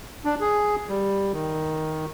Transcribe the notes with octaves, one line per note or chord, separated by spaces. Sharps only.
D4
G#4
G3
D#3